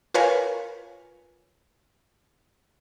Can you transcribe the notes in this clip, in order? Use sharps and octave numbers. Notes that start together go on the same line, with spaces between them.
F4 A#4 B4 C#5 F5 G#5